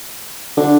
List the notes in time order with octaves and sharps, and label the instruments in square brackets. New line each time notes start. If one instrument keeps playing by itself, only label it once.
[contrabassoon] D3